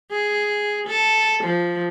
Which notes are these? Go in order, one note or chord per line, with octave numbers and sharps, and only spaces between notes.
G#4
A4
F3